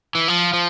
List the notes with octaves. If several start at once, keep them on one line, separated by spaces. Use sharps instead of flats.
E3
F3
F3